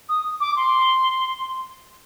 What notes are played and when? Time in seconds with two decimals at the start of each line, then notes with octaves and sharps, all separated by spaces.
0.09 D#6
0.40 D6
0.56 C6